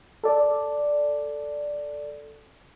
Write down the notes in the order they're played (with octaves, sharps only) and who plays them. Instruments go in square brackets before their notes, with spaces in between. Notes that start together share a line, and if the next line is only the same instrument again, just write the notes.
[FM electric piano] A4 D5